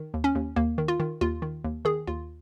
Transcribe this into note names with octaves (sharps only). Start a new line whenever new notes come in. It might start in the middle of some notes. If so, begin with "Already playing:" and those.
Already playing: D#3
D#2
C#4
D#2
D#2 A#3
D#3
F4
D#3
D#2 F4
D#3
D#2
D#3 G#4
D#2 F4